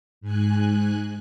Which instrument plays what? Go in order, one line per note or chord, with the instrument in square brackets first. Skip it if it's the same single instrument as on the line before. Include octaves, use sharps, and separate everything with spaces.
[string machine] G#2 G#5 F#6